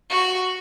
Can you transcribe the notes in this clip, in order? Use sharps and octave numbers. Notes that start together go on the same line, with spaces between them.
F#4